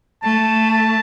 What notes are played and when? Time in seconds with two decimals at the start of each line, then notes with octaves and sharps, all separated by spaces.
0.24 A3 A5
0.71 A5